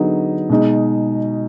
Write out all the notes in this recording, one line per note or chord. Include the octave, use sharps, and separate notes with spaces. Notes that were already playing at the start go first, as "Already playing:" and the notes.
Already playing: D3 F#3 B3 D#4 G#4
B2 G#3 D#4